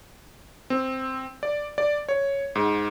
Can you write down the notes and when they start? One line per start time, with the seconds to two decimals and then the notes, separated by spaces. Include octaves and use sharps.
0.70 C4
1.43 D5
1.78 D5
2.09 C#5
2.55 G#2